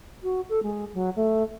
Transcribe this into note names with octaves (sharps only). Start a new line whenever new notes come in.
F#4
A4
G#3
F#3
A3